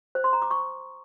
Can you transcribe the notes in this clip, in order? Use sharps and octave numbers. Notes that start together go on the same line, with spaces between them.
C5
C6
A#5
D6
C#6